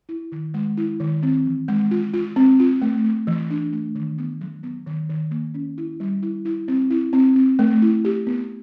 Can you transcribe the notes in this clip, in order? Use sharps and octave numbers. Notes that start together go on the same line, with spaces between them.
E4
D#3
G#3
E4
D#3
C4
E3
G#3
F4
F4
C4
F4
A3
A3
E3
D4
A3
D#3
B3
F#3
B3
D#3
D#3
A#3
C#4
E4
G3
E4
E4
C4
E4
C4
C4
A3
E4
G4
B3